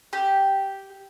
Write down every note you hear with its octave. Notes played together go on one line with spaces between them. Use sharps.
G4